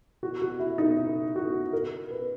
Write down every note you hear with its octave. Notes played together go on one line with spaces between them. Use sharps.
F#4
F#4
E4
D#4
E4
F#4
A#4
B4